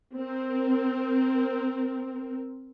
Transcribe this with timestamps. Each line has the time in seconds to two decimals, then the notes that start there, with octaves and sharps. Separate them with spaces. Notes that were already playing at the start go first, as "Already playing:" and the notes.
0.17 C4 A#4